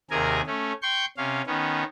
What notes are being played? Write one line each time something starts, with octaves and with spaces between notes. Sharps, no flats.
D#2 C3 G#4 A#4 G#5
A3 C#4
G5 C6 C#6 G6
C3 C#4 F5
D#3 B3 C#4